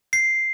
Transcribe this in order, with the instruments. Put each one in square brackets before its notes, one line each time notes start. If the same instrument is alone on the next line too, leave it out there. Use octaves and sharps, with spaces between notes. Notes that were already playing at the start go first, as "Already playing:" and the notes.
[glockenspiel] C7